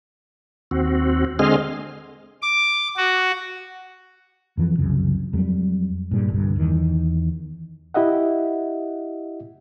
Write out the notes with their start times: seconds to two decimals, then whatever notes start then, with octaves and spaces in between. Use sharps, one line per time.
0.71 D#2 C4 F#4
1.39 D3 G#3 C4 G#4 D#5 F6
2.42 D6
2.96 F#4
4.57 F2 E3 F3
4.78 C2 F#2 C#3
5.33 F2 F#3 G3
6.11 G2 A#2 G3
6.30 G1 C2 G2
6.56 E2 D#3
7.94 E4 G4 D#5 E5 F#5